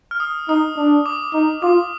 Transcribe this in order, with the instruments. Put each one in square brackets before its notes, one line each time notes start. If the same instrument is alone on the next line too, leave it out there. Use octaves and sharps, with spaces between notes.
[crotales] F6
D#6
[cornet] D#4 [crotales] D#6
[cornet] D4
[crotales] D6
[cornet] D#4
[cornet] F4 [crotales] D6